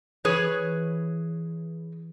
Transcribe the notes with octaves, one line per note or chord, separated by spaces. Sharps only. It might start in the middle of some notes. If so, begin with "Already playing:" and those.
E3 G#4 B4 C#5